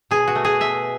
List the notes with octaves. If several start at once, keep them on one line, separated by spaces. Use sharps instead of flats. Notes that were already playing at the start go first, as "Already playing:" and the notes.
B2 G#4
F#4
A3
G#4
B2 E5